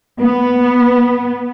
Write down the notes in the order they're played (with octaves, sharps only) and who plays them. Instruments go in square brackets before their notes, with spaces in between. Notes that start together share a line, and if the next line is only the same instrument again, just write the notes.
[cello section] B3